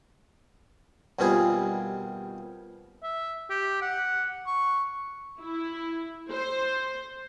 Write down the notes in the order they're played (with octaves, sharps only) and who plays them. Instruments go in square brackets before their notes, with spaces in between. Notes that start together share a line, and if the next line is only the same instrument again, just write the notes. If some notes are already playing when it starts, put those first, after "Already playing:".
[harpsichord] D#2 B2 G3 C4 F4 G#4
[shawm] E5
G4
F#5
C#6
[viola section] E4
C5